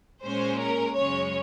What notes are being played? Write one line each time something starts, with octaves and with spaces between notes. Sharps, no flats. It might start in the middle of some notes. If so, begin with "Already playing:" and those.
A#2 G#3 C#4 C5
A#4
F#2 C#3 G#3 C#4 C#5